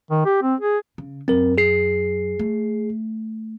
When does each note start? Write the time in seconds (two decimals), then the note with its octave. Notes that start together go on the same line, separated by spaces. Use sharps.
0.10 D#3
0.25 G4
0.42 C4
0.60 G#4
0.98 C#3
1.28 F#2 C4 A#4
1.58 G#4 C7
2.39 A3